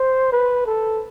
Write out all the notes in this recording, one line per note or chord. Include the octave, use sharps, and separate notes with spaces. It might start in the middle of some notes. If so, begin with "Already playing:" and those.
Already playing: C5
B4
A4